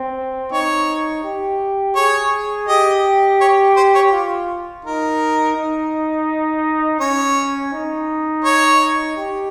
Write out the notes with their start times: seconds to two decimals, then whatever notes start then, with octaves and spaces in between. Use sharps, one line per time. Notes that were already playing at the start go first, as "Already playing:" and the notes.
Already playing: C4
0.52 D#4 C#5
1.24 G4
1.96 G#4 C#5
2.68 G4 D#5
3.41 C#5
3.77 C5
3.95 C#5
4.12 F4
4.84 D#4 A#4
5.56 D#4
7.00 C#4 C#5
7.73 D#4
8.45 C#5
9.17 G4